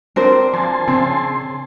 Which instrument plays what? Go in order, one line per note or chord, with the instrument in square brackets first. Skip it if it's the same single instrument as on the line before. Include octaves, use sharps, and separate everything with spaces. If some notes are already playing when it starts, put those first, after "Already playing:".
[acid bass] C4 [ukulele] D4 A#4 C5
[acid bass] F3 [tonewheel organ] G#5 A5 C6
[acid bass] C#3 [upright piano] C4